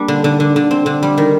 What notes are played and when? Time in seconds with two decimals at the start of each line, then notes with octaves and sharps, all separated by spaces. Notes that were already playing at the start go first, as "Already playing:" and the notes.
Already playing: G3 A#3 D4
0.08 D3
0.24 D3
0.40 D3
0.56 D3
0.71 C4
0.86 D3
1.03 G3
1.18 D#3